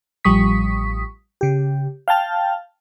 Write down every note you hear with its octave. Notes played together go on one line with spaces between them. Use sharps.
A1 F3 G3 C#6 D#6 B6
C#3 G4
F5 G5 A5 F6